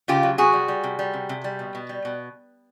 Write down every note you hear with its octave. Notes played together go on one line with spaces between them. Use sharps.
C#3 F4 G4
F#3
C3 F#4 G#4
G3
G3
C3
G3
C3
C3
G3
B2
B2
G3
B2